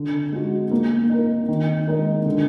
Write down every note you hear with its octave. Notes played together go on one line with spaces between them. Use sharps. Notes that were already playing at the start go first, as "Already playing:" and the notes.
Already playing: D3
G#3 D#4 F#4
A#3
D#4 A#4
D#3
G#3 D#4 A#4
D3